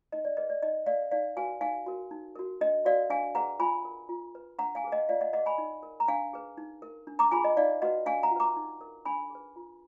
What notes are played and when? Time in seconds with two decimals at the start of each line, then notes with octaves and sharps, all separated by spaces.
0.12 D#4 D#5
0.25 D5
0.37 G#4 B4 D#5
0.50 D5
0.62 D#4 D#5
0.86 A#4 D5 F5
1.11 D#4 D5 F5
1.36 F#4 B4 F5 G#5
1.61 D#4 F5 G#5
1.86 F#4 A#4
2.11 D#4
2.36 F#4 A#4
2.61 D4 D#5
2.85 F#4 A#4 D5 F5
3.10 D4 F5 G#5
3.35 G#4 B4 F#5 A#5
3.59 F4 G#5 B5
3.85 A#4
4.09 F4
4.35 B4
4.59 D4 F#5 A#5
4.75 F5 G#5
4.84 G#4 B4
4.92 D#5 F#5
5.09 F4 D5 F5
5.21 D#5 F#5
5.33 G#4 B4 D#5 F#5
5.46 G#5 B5
5.58 D#4
5.83 A#4
6.00 A#5
6.08 D4 F5 G#5
6.33 G#4 B4
6.57 D#4
6.82 A#4
7.07 D4
7.19 A#5 D6
7.31 F4 G#4 G#5 B5
7.44 D#5
7.57 D#4 D5 F5
7.82 F#4 B4 D#5 F#5
8.06 D4 F5 G#5
8.23 F#5 A#5
8.31 F4
8.36 B4 A#5 D6
8.56 D#4
8.81 A#4
9.05 D4 G#5 B5
9.30 G#4
9.35 B4
9.56 F4